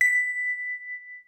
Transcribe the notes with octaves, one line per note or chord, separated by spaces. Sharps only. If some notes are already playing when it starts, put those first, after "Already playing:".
B6